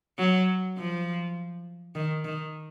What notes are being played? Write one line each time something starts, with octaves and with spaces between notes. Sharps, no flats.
F#3
F3
D#3
D#3